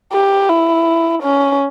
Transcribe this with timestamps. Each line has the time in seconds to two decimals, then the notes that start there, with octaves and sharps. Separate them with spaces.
0.13 G4
0.49 E4
1.23 C#4